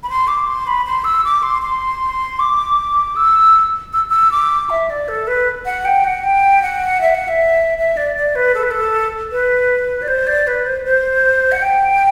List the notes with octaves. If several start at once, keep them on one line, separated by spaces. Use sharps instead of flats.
B5
C6
D6
C6
B5
C6
E6
D6
C6
C6
D6
E6
E6
E6
D6
E5
D5
A4
B4
F#5
G5
F#5
G5
F#5
E5
F#5
E5
E5
D5
D5
B4
A4
B4
A4
B4
D5
C5
D5
B4
C5
C5
F#5
G5